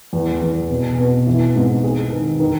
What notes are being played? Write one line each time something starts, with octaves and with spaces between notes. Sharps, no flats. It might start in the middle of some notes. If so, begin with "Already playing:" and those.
E2
E2
B2
B2
E3
G#2
G#4
D#3
D#3